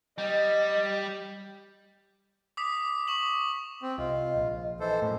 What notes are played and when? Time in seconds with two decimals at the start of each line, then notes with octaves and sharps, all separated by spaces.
0.18 G3 D#5
2.57 D6 D#6 B6
3.08 C#6 E7 F#7
3.82 C4
3.98 C2 F4 D#5
4.36 A#1
4.80 E3 A4 C5 D#5
5.02 F#2 A2